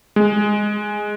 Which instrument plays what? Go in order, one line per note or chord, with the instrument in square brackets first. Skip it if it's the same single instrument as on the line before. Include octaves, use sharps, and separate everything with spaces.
[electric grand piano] G#3